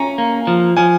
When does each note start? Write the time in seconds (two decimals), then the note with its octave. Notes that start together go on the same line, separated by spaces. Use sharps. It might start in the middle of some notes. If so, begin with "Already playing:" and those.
Already playing: C#4 A#5
0.18 A#3
0.47 F3
0.77 F3 G#5